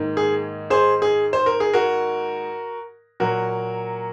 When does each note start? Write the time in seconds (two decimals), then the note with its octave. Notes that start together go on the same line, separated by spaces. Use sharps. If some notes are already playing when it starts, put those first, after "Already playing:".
Already playing: G#2 D#3 A#3
0.17 G#4
0.70 G#4 C5
1.02 G#4
1.33 C5
1.46 A#4
1.60 G#4
1.73 F#4 A#4
3.20 A#2 F#3 A#3 F#4 A#4